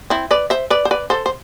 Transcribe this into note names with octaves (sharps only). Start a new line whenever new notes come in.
C4 E4
B4 D5
C5 E5
B4 D5
C5
B4 D5
A4 C5
C5